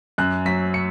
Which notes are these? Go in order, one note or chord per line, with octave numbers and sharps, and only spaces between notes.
F#2 F#6
F#3 B6
C#7